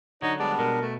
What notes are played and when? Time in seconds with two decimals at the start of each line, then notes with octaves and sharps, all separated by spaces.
0.22 D3 F#3 D#4 C#5
0.40 G3 G#3 B3 D4 D5
0.59 B2 A#4
0.81 A3